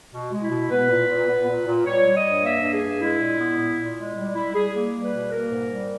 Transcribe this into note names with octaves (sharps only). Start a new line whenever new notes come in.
B2
G#3
E4
B2
B3 B4
A#2
A#2
B3
A#2
A#2
G3 C#5
G3
D#5
G2
A#3 E5
G2
G#4
G2
G#3 E4
A#2
B3
A#2
A#2
G#3
G3
G3 E4
G3 G#4
A#3
G3
B4
B2
A#3 A#4
G#2
G3